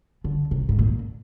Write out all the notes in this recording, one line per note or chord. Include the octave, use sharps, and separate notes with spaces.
D3
C3
G#2
A#2